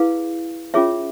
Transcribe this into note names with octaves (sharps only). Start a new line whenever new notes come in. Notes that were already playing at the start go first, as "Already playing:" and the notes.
Already playing: E4 G#4 B4 F5
C#4 F4 G#4 C#5 E5